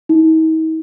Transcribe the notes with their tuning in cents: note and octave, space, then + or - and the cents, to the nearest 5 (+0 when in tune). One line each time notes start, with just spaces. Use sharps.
D#4 +45